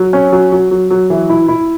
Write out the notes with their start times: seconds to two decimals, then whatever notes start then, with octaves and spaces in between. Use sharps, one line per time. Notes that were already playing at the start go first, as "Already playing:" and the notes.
Already playing: F#3
0.13 C#4
0.32 F#3
0.52 F#3
0.71 F#3
0.91 F#3
1.10 E3
1.29 E4
1.48 E4